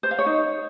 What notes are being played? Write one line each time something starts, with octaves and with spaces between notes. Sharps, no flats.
C5
F5
C#5
D#4